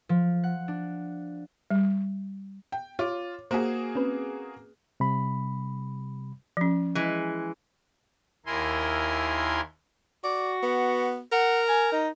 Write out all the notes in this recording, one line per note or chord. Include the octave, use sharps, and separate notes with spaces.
F3
F#5
D4
G3
G5
F4 C#5 D6
A#3 F#4 G#4 C5
C4 C#4 B4
C3 G3 B5
F3 C#4
E3 G#3
D#2 E4 A#4 G#5 C6
F#4 D5
B3
A#4 F#5
G#5
D#4